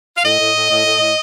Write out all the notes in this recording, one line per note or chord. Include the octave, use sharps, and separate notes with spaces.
F5
A2 D#5
A2
A2
A2
A2
A2